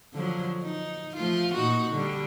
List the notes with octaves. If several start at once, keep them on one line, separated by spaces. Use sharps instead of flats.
D3 F3 F#3
D#4
F3 A3 F4
A#2 D#4 F#4
D3 G3